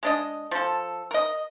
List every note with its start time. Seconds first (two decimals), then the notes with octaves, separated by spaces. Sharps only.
0.03 G#3 D4 D#5
0.51 F3 A4
1.11 A#4 D#5